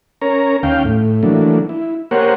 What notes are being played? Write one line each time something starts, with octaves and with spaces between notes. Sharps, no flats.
C#4 A#4 C#5 A#5
D#2 C#4 F5 G5
A2
E3 F#3 A3 A#3 D4
E4
A#3 G4 A#4 C5 C#5 F#5